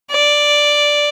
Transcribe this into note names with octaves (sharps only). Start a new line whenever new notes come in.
D5